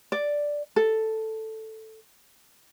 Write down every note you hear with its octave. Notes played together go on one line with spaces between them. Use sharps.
D5
A4